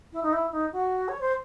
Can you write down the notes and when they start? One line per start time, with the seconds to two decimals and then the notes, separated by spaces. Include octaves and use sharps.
0.13 E4
0.22 D#4
0.32 E4
0.52 D#4
0.72 F#4
1.08 C#5
1.20 C5